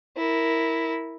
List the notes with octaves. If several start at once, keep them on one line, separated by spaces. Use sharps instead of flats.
E4 A#4